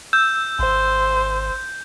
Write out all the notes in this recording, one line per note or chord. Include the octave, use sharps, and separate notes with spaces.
E6 G6
G#1 C5